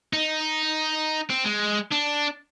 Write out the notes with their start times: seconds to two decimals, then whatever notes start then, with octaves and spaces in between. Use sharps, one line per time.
0.13 D#4
1.30 C4
1.44 G#3
1.92 D4